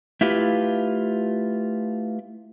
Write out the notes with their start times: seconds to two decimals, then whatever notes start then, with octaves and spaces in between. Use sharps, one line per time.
0.21 A3 E4 F4 G4 B4